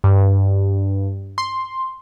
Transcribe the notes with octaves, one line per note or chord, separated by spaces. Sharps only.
G2
C6